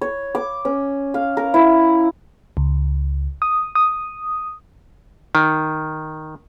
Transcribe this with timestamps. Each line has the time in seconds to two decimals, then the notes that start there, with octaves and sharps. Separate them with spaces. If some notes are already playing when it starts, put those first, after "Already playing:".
0.01 C#5
0.35 D6
0.65 C#4
1.14 F5
1.37 A#4
1.54 E4
2.57 C#2
3.42 D#6
3.75 D#6
5.35 D#3